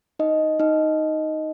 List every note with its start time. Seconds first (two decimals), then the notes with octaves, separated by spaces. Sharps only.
0.19 D#4 D#5
0.60 D#4 D#5